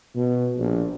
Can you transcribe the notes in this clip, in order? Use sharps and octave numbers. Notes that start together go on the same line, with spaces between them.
B2
A#1